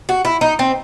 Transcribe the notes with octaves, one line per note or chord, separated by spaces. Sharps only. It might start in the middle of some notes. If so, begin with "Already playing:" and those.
F#4
E4
D#4
C4